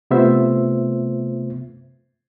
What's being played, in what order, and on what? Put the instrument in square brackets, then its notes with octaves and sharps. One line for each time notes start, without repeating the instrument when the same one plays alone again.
[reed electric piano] C3 A3 B3 F4 C5 E5